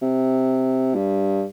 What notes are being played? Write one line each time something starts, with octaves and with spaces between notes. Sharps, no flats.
C3
G2